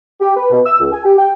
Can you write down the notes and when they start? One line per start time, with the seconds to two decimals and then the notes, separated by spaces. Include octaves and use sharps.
0.21 G4
0.36 B4
0.51 B2
0.65 E6
0.80 C#2
0.92 G#5
1.05 G4
1.18 G5